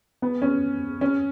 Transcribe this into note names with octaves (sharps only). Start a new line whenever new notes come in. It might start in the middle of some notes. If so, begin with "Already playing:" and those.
B3
C#4
C#4